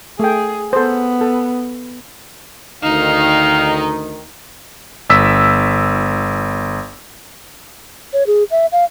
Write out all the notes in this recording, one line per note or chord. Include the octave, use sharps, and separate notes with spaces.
A3 G#4 G5
B3 A4 C5
A4
D2 D#3 D#4 F5
G1 E6 B6
C#5
G#4
E5
F5